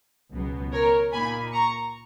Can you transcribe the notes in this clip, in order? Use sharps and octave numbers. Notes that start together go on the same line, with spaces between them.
C#2 B2 F#3 B3
A#4 C#5
A#2 A#3 D#4 G#5 B5
A#5 C#6